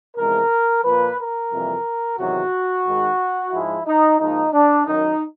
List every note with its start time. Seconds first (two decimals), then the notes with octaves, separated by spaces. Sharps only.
0.17 E2 C3 F3 G#3 A#4
0.84 A#2 F3 A#3 B4
1.18 A#4
1.52 F2 C3 E3 G3 A#3
2.19 E2 C3 D#3 F#3 F#4
2.85 G#2 D#3 G#3
3.53 G#2 F3 G#3 E4
3.87 D#4
4.20 G#2 F3 A#3 D#4
4.53 D4
4.87 F#2 D#3 F#3 D#4